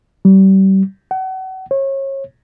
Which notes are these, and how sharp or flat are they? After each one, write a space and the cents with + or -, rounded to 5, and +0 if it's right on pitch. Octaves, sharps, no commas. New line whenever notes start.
G3 -30
F#5 +35
C#5 -30